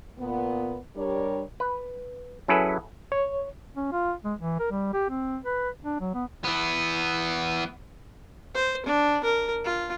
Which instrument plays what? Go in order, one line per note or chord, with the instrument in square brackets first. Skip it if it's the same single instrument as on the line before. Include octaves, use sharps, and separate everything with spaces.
[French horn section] A#2 B3
G3 D4 G4 A#4 C#5 D5
[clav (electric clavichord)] B4
F#3 C#4 E4 G#4 A4 B4
[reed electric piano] C#5
[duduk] C#4
F4
G#3
E3
A#4
G3
G4
C4
B4
D4
F#3
B3
[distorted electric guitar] E3 B3
[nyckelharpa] C5
D4
A#4
F4